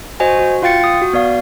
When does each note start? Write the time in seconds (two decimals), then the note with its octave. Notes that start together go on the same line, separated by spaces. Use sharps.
0.20 F#4 C5 D#5 G#5
0.39 F#4
0.62 F4 F5 G5 A6 C#7
0.84 D#6
1.02 F#4
1.13 B3 D5 F5